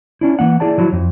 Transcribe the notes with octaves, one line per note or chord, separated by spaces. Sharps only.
C#4 D4 E4
E3 A#3 F#5
E4 G#4 D5 A5
F3 F#3 E4
F2